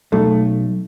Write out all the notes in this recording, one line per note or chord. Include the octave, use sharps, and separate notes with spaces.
B1 A3